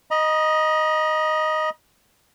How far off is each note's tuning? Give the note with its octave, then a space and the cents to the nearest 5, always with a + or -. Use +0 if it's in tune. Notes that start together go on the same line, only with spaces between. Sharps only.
D#5 +0 A#5 +45